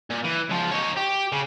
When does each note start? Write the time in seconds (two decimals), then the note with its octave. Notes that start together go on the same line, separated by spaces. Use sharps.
0.10 A#2
0.24 E3
0.49 C#2 F3
0.71 D#4 C#5
0.97 G4
1.32 C#3